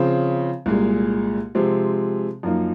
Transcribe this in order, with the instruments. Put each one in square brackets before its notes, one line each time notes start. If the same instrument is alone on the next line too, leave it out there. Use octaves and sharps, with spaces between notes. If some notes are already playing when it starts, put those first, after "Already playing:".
Already playing: [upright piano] C#3 F3 C4
C2 A#2 G#3
C3 F3 G#3 C4
F#2 F3 A#3 D#4